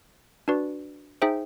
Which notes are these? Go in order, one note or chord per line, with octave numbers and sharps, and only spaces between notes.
D4 F#4 B4 D5
D#4 G#4 C5 E5 G5